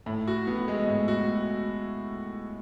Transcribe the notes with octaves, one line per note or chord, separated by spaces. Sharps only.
A2
F#4
B3
G#3
A2
F#4